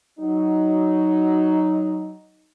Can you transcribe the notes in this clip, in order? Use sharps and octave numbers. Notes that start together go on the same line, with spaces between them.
F#3 D#4